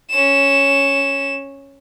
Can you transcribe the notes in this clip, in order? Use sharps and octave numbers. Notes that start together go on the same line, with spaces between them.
C#4 E7